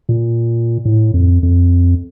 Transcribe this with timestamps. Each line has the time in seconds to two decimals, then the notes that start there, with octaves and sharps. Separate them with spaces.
0.09 A#2
0.85 A2
1.14 F2
1.43 F2